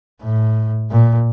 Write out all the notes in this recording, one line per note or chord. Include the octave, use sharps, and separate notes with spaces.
A2
A#2